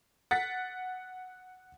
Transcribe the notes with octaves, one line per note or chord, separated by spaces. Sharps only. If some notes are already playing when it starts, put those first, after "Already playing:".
F#5 A6 B6